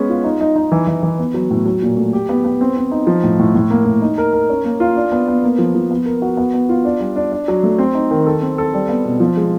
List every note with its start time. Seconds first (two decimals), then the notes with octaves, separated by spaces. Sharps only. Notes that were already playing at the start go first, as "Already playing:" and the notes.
Already playing: G#3 B3 C#4
0.09 F4
0.24 D#4
0.41 D#4
0.56 D#4
0.72 E3
0.87 E3
1.03 E3
1.19 B3
1.34 F#3
1.51 A2
1.66 F#3
1.82 A#2
1.97 A3
2.13 G4
2.29 B3
2.45 B3
2.61 C4
2.77 C4
2.91 D#4
3.07 F3
3.23 A2
3.39 A2
3.55 A2
3.70 A#3
3.86 A2
4.02 D#4
4.18 A#4
4.33 A#4
4.50 C#4
4.65 A#3
4.80 F4
4.96 D4
5.12 B3
5.28 B3
5.44 A#3
5.58 F3
5.75 F3
5.91 B3
6.06 A#4
6.22 F#4
6.37 B3
6.54 B3
6.69 F4
6.85 D4
7.00 G3
7.16 D4
7.32 D4
7.48 F#3
7.63 A3
7.78 C4
7.95 D#4
8.11 D#3
8.26 A4
8.42 C4
8.58 A4
8.74 G3
8.89 B3
9.05 B2
9.20 F3
9.37 G#3